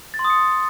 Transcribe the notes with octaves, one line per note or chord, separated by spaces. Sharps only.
A6
C6
D#6
C#7